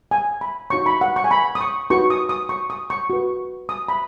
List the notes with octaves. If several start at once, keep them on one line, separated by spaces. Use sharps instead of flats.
G#5
B5
D#4 F#4 C#5 C#6
B5
F#5
C#6
G#5
B5
D#6
C#6
D#4 F#4 B4 C#6
D#6
D#6
C#6
D#6
C#6
F#4 B4
D#6
B5